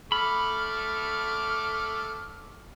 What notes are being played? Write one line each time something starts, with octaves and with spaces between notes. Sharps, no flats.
A3 A4 B5 D6 F6